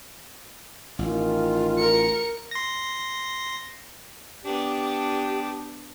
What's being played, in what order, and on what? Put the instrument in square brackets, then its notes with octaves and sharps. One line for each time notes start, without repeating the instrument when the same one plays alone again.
[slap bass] A1 [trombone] D#3 [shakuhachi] F4
[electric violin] A#4 C#7
[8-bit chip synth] C6 A#6
[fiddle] B3 D4 [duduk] G4